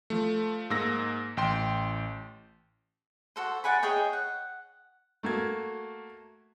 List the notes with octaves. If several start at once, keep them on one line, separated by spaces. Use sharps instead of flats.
F3 A3
G#2 A#3 E6 A#6
A1 G5 C6
F#4 A4 C5
D5 F#5 G#5 B5
G#4 C#5 D#5 G5
F#5
A3 A#3 F#4 G#6